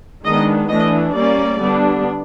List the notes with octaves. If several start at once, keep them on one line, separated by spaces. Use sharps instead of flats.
D#3 G#3 B3 D4 D#5
E3 A3 D4 D#5
G3 A#3 C#4 D5
D3 G3 B3 D4